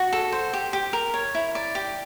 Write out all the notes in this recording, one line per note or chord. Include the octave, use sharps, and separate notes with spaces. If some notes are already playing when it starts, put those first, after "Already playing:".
Already playing: F#4
A4
C5
G4
G4
A#4
C#5
E4
D5
G4